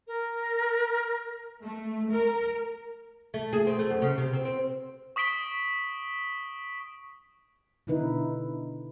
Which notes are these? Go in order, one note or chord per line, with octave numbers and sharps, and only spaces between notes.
A#4
A3
A#4
A3
G#4
C4
A3
F#2
C#3
C3
C4
C4
C#6 D#6 B6 D7 G7
B2 D3 D#4 E4 B4